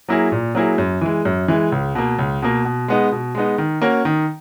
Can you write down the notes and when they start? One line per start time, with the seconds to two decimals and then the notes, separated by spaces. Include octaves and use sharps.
0.09 F#3 A#3 E4 G#4
0.32 A#2
0.55 F#3 A#3 E4 G#4
0.78 F#2
1.01 E3 G#3
1.25 F#2
1.48 E3 G#3
1.72 C#2
1.95 B2 A#3
2.19 C#2
2.42 B2 A#3
2.65 B2
2.88 G#3 B3 D#4
3.12 B2
3.35 G#3 B3 D#4
3.58 D#3
3.82 A#3 C#4 F#4 A#4
4.05 D#3